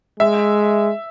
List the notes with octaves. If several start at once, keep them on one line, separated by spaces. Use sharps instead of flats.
G#3 E5